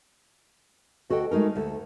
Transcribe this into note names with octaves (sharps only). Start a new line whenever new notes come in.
D2 F#4 A4 D#5 G5
G#3 A3 D#4 A#4
D2 A4